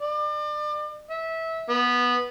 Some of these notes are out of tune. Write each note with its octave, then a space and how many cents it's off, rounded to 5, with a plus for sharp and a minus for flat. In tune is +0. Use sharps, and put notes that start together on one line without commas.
D5 +35
E5 -20
B3 -10